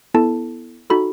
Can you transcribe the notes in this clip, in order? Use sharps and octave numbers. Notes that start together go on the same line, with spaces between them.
B3 E4 A4 A5
D#4 F#4 A4 B5